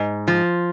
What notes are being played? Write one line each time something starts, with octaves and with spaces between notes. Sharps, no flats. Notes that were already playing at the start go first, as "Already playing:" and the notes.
Already playing: G#2
F3